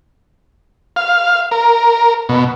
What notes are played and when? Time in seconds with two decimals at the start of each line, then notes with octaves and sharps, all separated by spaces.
0.96 F5
1.51 A#4
2.29 B2